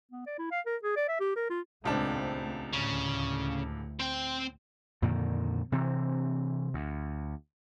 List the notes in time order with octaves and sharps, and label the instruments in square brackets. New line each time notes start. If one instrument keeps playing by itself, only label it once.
[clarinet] B3
D5
E4
F5
A#4
G#4
D5
E5
G4
A#4
F4
[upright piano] D#1 C#2 D4 [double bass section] A3 C4
[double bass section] D2 A2 [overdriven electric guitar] C#3
[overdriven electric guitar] C4 G5
[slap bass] F2 A#2 D3 D#3
C3 E3 C4
D2